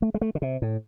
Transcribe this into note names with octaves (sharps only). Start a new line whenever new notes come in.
A3
G#3
A3
D3
C3
A2